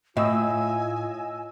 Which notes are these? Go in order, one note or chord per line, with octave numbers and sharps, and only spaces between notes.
A2 F4 D#5 G#5 E6